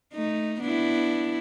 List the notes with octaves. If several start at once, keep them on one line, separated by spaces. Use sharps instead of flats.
A3 D#4
B3 D4 E4